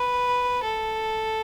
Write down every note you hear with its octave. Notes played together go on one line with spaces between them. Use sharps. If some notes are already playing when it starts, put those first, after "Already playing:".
Already playing: B4
A4